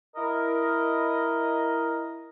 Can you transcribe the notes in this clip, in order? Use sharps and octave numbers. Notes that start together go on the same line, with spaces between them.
E4 A#4 D#5